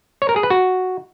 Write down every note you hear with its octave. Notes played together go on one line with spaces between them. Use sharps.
C#5
A#4
G#4
B4
F#4